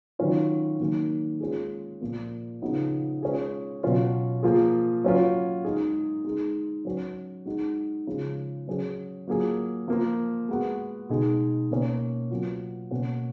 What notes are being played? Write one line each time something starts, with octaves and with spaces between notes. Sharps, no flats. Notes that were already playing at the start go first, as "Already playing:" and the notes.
D#3 F#3 C#4 F4
D#3 F#3 A#3
G#3 C#4 F4 G#4
A#2 F3 A#3
C#3 F3 B3 D#4 F#4
G#3 C#4 F4 G#4
B2 F#3 C#4 F4
F3 A#3 F4 G#4
F#3 C#4 F4
G#3 D#4 G#4
G#3 D#4 G#4
F#3 C#4 F#4
G#3 D#4 F#4
C#3 F3 G#3
F#3 C#4 G#4
F#3 A#3 F4 G#4
F3 A#3 F4
G#3 B3 F#4
B2 G#3 D#4 G#4
B2 A#3 C#4
F#3 B3 F4
B2 A#3 C#4 F#4